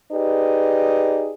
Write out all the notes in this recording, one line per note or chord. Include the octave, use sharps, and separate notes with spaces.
D#4 G4 G#4 B4 D5